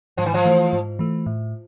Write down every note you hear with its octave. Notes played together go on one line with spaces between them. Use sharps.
G#2 F3
E3
F3
E3 A3
G#2
E3 A3
A2